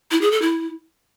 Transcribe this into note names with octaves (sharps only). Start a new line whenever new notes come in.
E4
G#4
A4
E4